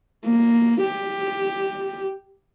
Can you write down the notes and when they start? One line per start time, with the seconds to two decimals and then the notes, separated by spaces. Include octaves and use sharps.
0.25 A#3
0.81 G4